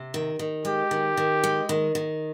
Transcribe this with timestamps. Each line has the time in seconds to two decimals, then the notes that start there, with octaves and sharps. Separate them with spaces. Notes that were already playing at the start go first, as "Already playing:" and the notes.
Already playing: C3
0.14 D#3
0.39 D#3
0.65 G#3 G4
0.91 D#3
1.17 D#3
1.44 G#3
1.69 D#3
1.95 D#3